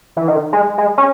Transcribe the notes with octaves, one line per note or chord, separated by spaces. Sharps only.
E3
D#3
G#3
G#3
C#4